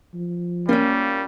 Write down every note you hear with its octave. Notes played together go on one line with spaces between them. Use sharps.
F3
G3 A#3 C#4 F4